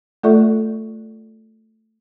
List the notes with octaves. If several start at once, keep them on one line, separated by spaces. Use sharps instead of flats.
A3 F4 A4 D5 E5 C#6